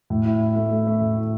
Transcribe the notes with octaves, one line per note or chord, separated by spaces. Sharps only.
A2
E4
E4
A3
A3
A3
A2
E4